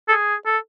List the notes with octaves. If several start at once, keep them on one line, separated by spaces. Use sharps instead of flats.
A4
G#4
A4